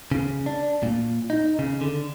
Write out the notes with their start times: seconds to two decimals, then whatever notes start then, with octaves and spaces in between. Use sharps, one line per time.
0.12 C#3
0.46 D4
0.83 A#2
1.30 D#4
1.59 C#3
1.81 D3